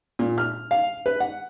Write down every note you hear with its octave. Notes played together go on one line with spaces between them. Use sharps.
A#2
F6
F5
B4
F#5